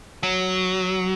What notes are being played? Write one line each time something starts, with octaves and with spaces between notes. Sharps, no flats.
F#3